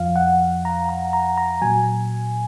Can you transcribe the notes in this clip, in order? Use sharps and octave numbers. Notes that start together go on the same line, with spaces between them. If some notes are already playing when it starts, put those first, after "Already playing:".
Already playing: F2 F3 F5
F#5
A#5
A#5
A#5
A#5
A#2 F#3 G#5